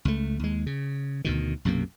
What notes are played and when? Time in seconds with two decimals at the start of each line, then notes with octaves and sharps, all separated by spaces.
0.05 C#2 A3
0.39 D#2 G#3
0.66 C#3
1.24 D2 B2 D#3
1.65 B1 F#2 C3 A#3